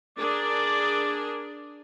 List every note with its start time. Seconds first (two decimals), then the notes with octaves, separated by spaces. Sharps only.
0.18 D4 G#4 A#4 D5